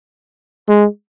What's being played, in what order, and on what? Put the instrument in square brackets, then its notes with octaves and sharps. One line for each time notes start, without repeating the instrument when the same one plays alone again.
[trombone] G#3